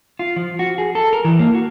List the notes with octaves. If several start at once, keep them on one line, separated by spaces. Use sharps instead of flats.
F4
F3
F#4
G#4
A4
A#4
E3
A#3
F#4